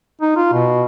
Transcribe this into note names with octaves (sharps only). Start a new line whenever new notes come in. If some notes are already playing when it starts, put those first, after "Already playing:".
D#4
F4
B2